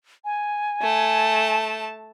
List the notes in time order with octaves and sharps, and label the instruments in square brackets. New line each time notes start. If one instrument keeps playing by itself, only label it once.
[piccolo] G#5
[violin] A3 A5